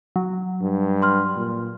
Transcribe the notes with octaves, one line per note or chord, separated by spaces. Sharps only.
F#3
G2
C6 F6
A#2